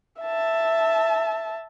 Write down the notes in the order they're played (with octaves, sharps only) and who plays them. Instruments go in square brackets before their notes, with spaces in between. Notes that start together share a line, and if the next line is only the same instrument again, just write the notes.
[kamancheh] E5 A5